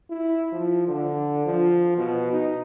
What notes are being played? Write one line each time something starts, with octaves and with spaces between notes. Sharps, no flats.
E4
F3
D3
F3
B2
D#4